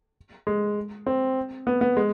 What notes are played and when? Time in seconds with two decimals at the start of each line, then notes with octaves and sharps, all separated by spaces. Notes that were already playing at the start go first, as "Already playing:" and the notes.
0.47 G#3
1.07 C4
1.67 B3
1.81 B3
1.97 G#3